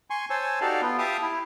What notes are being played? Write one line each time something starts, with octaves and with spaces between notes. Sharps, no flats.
G#5 C6 C#6
C5 C#5 G#5 A5 E6
D#4 F#4 G4 A4 D5 F5
B3 F4
G4 E5 F5 A5 D6 D#6
E4